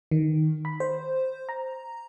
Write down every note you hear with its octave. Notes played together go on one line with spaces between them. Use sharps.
D#3
B5
C5
A#5